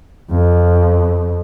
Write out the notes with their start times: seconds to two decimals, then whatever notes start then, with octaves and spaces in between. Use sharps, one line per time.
0.31 F2